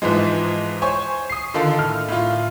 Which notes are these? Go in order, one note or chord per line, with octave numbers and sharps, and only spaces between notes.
G#2 E3 F3 G#3
C5 C#5 G#5 C#6
D#6 C7
D3 D#3 F4 A4
A2 F6
A2 F4